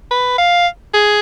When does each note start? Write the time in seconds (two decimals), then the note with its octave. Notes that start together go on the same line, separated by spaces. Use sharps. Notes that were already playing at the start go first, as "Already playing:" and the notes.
0.11 B4
0.38 F5
0.94 G#4